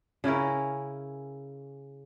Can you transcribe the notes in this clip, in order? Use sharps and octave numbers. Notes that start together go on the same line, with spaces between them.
C#3 C#4 E4 A#4